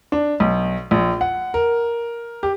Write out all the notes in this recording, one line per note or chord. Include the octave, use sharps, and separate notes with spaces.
D4
B1
A#1
F#5
A#4
G4